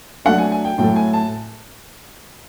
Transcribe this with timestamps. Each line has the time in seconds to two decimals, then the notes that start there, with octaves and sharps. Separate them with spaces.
0.25 F#3 A3 D4 F#5
0.38 G#5
0.52 G#5
0.64 G5
0.78 A2 F#3 A3 G5
0.96 G#5
1.13 A5